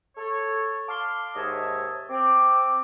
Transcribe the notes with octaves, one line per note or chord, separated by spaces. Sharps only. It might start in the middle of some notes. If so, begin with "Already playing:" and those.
A4 C#5
F5 A5 C6 D6 F6
D#2 G#2 C#5 D#5 E5 A5
C4 D6